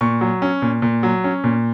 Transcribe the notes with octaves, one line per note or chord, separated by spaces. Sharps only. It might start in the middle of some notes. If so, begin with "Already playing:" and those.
A#2 C#6
F#3
C#4
A#2
A#2
F#3
C#4
A#2